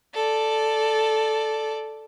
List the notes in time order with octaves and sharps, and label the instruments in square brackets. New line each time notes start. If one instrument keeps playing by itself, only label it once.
[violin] A4 D5